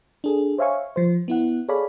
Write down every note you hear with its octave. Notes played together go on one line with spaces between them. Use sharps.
D4 G#4 A4
C5 C#5 E5 F5 G#5 C#6
F3 C5
B3 E4 F#5
G#4 A4 C#5 D5 F5 B5